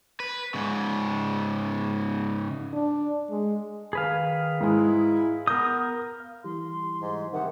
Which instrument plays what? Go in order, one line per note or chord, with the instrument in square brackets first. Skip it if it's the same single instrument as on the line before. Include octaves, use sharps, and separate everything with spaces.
[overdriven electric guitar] B4
G#2 C#3
[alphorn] D4
G#3
[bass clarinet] D#3 [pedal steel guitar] G#4 B4 F5
[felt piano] G#2 G#3 [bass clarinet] E4
[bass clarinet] B3 [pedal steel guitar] A#4 D#6 [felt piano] G6
[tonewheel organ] F5
[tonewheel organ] E3 G3 [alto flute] C6
[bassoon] G#2
[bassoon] C3 [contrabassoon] D#3 [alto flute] F#5